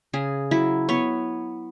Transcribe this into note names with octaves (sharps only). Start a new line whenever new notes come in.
C#3 G#4
F#3 E4
B3 C#5